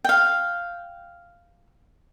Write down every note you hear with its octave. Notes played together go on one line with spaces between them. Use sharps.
F5 G5